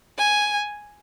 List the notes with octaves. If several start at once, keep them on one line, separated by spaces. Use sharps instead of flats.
G#5